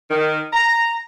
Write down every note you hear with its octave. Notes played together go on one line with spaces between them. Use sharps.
D#3
A#5